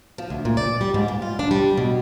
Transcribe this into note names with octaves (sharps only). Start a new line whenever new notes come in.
F3
D2
A#2
D5
G3
G#2
A#2
F4
D4
G3
B2